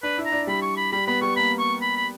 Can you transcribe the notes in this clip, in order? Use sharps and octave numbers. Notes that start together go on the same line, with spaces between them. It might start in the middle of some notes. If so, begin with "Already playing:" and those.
D4 B4
E4
A#5
D4
G3 B5
C#6
B5
G3 B5
B3 B5
G3 C#6
A#3 B5
C#6
B5
B5